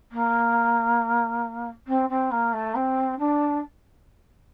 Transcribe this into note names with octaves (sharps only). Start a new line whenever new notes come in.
A#3
C4
C4
A#3
A3
C4
D4